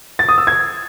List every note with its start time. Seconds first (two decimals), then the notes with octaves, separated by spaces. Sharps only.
0.19 A6
0.29 D#6
0.38 E6
0.47 G#6